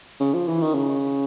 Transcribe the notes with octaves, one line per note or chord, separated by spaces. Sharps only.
C#3
F3
E3
D#3
C#3